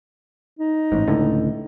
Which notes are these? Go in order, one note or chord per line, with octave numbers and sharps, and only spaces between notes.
D#4
A1 G#2
C#2 A2 D3